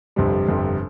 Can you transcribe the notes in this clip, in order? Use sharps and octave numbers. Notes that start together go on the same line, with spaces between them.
G1 F2 C3 G3
G1 F2 C3 G3